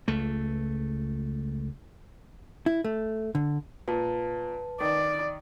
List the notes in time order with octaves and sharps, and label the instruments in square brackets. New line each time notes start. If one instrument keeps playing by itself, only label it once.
[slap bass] C#2 A3
[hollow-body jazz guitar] E4
A3
D3
[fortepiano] A#2 [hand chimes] B4 A5
[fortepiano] D#3 [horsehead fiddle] D5